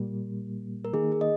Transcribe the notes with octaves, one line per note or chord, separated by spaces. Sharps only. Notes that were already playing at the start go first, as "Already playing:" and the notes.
Already playing: A#2 G3 A#3
A#4
D#3 A#3 D#4 G#4
G#4
D#5